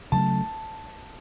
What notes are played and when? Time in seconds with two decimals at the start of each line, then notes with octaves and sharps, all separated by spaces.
0.12 C#3 F#3 A3 A5